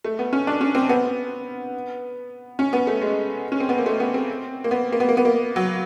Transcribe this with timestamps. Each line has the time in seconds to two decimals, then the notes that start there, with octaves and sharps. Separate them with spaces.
0.05 A3
0.19 B3
0.33 C#4
0.47 D4
0.61 C#4
0.75 C4
0.89 B3
2.59 C#4
2.73 B3
2.87 A3
3.01 G#3
3.52 C#4
3.60 C4
3.69 B3
3.78 A#3
3.86 A3
4.00 B3
4.14 C4
4.64 A#3
4.71 B3
4.92 A#3
5.00 B3
5.09 A#3
5.17 B3
5.25 A#3
5.56 F#3